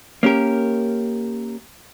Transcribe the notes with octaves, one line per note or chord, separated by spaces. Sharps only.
A#3 C#4 G4 A#4